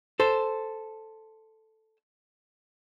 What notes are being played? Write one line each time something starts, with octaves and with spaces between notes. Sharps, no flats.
A4 C5